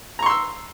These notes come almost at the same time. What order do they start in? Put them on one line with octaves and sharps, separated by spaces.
A#5 C#6 C6 E6